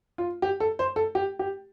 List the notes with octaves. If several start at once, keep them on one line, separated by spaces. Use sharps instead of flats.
F4
G4
A4
C5
A4
G4
G4